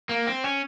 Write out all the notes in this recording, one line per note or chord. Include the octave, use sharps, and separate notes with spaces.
A#3
C4
C#4